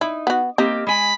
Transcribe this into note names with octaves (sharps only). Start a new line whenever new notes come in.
D#4 E4
B3 F#4
A#3 C4 D#4 G4
G#3 G#5 B5